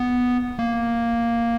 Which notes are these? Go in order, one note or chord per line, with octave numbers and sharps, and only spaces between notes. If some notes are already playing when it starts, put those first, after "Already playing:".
Already playing: B3
A#3